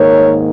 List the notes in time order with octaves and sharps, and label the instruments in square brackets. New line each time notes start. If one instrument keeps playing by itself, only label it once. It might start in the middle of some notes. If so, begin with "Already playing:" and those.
Already playing: [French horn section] G#2 D#3 A#3 A#4 C#5